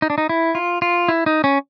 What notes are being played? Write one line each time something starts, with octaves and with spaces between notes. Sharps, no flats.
D#4
D4
D#4
E4
F4
F4
E4
D#4
C#4